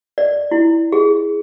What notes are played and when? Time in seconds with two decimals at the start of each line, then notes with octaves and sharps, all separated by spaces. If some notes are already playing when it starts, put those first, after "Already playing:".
0.18 D5
0.51 E4
0.92 G#4